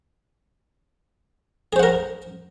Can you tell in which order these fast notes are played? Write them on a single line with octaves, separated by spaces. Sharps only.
G#4 C5 F#5 A#4